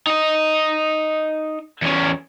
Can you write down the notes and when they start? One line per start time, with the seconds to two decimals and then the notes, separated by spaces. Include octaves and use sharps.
0.07 D#4 D#5
1.82 E2 C#4